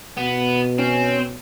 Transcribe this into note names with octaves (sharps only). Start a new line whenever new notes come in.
B2 B3
C4 C#4